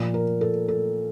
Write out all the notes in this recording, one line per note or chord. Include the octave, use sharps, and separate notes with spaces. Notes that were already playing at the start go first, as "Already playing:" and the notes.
Already playing: A#2 F3
A#4
A4
A4